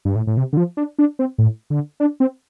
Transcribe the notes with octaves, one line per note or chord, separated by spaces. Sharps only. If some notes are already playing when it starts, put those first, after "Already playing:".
G2
A2
A2
C3
D3
F3
D4
D4
C4
A2
D3
D4
C4